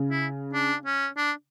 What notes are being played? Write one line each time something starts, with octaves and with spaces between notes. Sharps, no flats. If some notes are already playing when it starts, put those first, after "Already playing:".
Already playing: C#3
E4
D4
C#4
D4